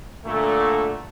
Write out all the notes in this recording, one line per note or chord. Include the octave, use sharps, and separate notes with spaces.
A#2 D3 A3